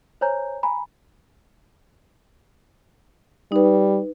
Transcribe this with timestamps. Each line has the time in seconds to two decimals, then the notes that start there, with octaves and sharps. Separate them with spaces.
0.21 C5 C#5 G#5 A#5 G6
0.63 G#5 A#5 B5
3.52 G3 D#4 B4